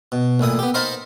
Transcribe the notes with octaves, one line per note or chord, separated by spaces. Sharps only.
B2
A1 A#2 E4 D#6
B3 G4
D#4 A#4 C5 F5 A5 B5